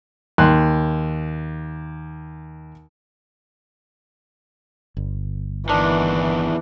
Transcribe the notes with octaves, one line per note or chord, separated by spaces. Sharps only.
D#2 C6 F#6
G1
E2 D#3 E3 D4